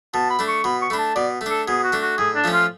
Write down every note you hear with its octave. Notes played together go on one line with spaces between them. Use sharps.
B2 A5
B5
A3 D4
C#6
B2 B5
C#6
A3 D4 B5
A5
B2 D5
A3
D4 A4
B2 G#4
F#4
A3 D4
F#4
A2 G#4
D4
F3 A3 C#4
F4